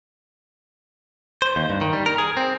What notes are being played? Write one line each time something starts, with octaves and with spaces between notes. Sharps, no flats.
C5
D#2
G2
D#3
G3
A#4
G#4
C4